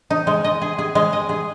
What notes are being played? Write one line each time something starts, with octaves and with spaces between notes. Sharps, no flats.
D#4
G#3
D#5
G#4
G#4
G#3
D#5
G#4